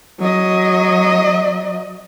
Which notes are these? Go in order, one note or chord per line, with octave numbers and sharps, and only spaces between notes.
F#3 D#5